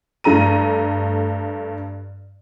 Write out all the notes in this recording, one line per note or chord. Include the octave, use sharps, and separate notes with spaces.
G2 A3 A#5 D#7